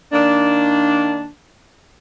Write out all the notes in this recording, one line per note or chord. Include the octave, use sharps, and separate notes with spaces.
D#3 A#3 D4